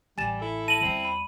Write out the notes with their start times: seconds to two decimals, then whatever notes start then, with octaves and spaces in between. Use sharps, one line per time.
0.18 A1 G3 G#5 A6 E7
0.40 E4 A4
0.68 A5 A#6 D#7 F#7
0.81 E2 G3 C4 E4
1.05 B5